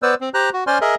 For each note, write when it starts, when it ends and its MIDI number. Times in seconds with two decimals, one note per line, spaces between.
0.03 0.15 59
0.03 0.15 71
0.03 0.15 72
0.03 0.15 74
0.03 0.15 88
0.21 0.29 60
0.34 0.50 67
0.34 0.50 72
0.34 0.50 82
0.34 0.50 90
0.53 0.64 66
0.67 0.78 61
0.67 0.78 72
0.67 0.78 74
0.67 0.78 80
0.67 0.78 84
0.67 0.78 89
0.81 0.95 68
0.81 0.95 70
0.81 0.95 75
0.81 0.95 76